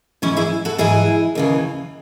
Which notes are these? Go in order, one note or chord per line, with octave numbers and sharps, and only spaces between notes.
G#2 E3 C#4 E4
E4 G#4
F#4 A4
G#2 E3 E4 G#4
D#2 C#3 E3